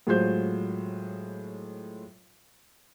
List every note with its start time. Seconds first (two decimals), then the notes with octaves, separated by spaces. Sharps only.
0.07 A2 F#3 G#3 F4 C5 G6